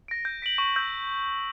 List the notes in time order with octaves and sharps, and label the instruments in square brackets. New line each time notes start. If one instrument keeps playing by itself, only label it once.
[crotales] A#6 D7
G6
B6 D7 F#7
C#6
E6 G6